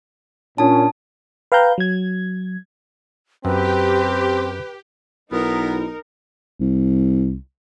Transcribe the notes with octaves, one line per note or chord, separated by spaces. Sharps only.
A#2 C#4 D4 A5
B4 F5 G5 A#5 G6
F#3 G#6
F#2 C4 G4 B4
B1 B3 D#4 E4 A#4
C2